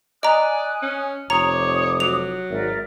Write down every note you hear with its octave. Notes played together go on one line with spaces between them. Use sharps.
D5 D#5 G#5 A#5 D#6 F#6
C#4
F1 C#5 A#5 D6 D#6
F#3 F7
G#1 A#4 D5 E5